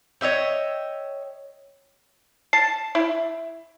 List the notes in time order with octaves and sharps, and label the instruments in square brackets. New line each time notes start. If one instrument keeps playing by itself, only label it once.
[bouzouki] C#5 D#5 E5 G5
[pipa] A5 [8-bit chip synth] C7
[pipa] E4